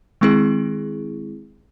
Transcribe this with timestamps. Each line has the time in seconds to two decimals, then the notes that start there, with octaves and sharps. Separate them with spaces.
0.21 D#3 G#3 C4 E4 G#4